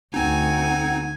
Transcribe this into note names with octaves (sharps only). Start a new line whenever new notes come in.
D2 C4 D#4 F#5 G#5